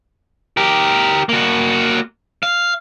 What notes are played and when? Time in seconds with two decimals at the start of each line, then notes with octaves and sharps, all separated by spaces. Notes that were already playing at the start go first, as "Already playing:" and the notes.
0.57 G4 A#4
1.29 A#3 F#4
2.43 F5